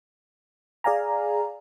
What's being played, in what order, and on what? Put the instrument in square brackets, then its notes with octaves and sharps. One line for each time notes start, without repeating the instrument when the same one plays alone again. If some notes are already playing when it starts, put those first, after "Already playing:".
[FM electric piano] G#4 D5 F5 G#5 A#5